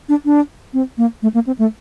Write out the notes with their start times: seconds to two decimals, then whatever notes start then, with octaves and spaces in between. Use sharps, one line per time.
0.09 D4
0.25 D4
0.73 C4
0.98 A#3
1.22 A3
1.34 A#3
1.47 C4
1.59 A3